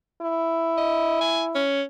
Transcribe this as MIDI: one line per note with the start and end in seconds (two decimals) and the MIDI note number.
0.22 1.65 64
0.77 1.17 75
1.21 1.43 80
1.55 1.83 61